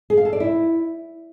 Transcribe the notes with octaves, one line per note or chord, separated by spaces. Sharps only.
G#4
F5
A4
D5
E4